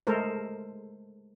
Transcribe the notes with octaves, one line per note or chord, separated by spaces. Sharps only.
G#3 A3 A4 A#4 C5